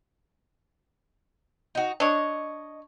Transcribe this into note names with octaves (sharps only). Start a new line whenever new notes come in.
D#4 F#4
D4 C#5 D#5